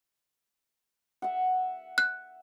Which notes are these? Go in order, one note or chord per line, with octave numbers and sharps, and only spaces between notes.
E5 F#5
F#6